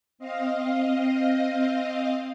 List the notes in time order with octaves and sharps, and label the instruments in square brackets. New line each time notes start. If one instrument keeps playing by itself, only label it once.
[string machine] C4 D#5 F5